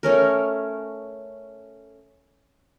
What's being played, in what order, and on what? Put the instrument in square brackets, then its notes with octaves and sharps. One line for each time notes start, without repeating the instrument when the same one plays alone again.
[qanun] A3 C#4 A#4